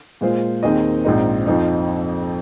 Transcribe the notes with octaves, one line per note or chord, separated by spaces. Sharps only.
A#2 G#3 F4 C5
D#2 D#3 C4 G#4 D#5
A#1 G#2 G#3 C4 D#4
F2 F3 C4 D#4